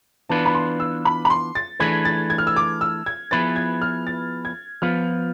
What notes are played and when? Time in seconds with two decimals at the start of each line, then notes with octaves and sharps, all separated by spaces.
0.29 E3 B3 D4 F4 B4 A5
0.46 B5
0.55 C6
0.80 E6
1.05 B5
1.25 B5
1.30 C6
1.55 A6
1.80 E3 A3 D4 G#4 B4 G#6
2.05 A6
2.30 G#6
2.38 F6
2.47 E6
2.56 D6
2.81 E6
3.06 G#6
3.31 F3 B3 E4 G#4 B4 A6
3.56 G#6
3.82 F6
4.07 A6
4.45 G#6
4.82 F3 B3 F4 F6